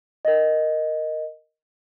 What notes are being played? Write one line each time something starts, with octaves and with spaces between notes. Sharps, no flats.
A#4 D#5